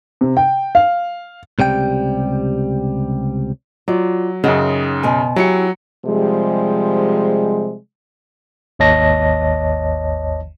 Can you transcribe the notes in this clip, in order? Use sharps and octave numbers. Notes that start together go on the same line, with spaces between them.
C3
G5
F5
C#2 C3 G3 G5
F#3 F4 D5
F#2 C#3 C4 D#4 F#5
B2 C5 G#5
F#3 E4 G4 G#5 C#7
C3 F3 G3 G#3
G#1 D#2 C#5 D#5 A5 A#6